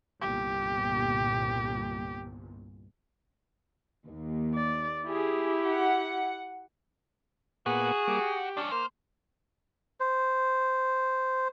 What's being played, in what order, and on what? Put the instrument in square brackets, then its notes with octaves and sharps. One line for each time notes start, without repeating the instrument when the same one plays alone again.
[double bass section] G1 C2 A#2 [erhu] G4
[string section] D#2
[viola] D5
[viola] E4 G4 [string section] G#4
[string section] F#5
[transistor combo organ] A#2 B3 F#5 [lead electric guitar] F#4 [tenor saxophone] G#4
[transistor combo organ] G3 A#3 D6
G4
[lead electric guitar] G2 C#4 [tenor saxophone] D4
[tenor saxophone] A#3 [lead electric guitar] C5 [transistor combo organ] F6
[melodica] C5